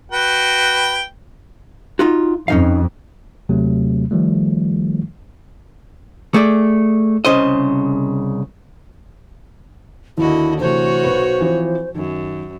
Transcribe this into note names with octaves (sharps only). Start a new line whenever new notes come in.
F#4 B4 G5
D#4 F4 F#4
F2 C#4 D#4 F5
D#2 C3 F#3 A3
D#3 F3 G3 A3
A3 G#4 D5
C2 C#3 C5 D#5
D#2 D3 E4 F#4 D#5
C3 E3 A3 F#4 C5 C#5
B1 B4
E3 F3 C4
F#2 D#3